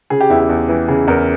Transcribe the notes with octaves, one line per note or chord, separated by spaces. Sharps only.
C#3 G#4
G4
E2 E4
G4
E2
E3
C#3 G#4
E2 A#4